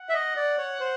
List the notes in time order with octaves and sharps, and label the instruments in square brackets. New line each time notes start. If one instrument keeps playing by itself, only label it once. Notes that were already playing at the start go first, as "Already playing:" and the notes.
Already playing: [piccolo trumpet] F#5
[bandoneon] E5
D#5
D5
C#5
C5